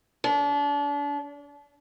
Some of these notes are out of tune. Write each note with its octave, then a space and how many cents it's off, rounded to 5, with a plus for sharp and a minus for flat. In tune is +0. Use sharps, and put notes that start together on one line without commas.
D4 -35